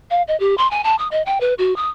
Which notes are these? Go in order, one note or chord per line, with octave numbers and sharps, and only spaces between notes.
F5
D#5
G4
C6
G#5
A5
D#6
D#5
G5
B4
F#4
D#6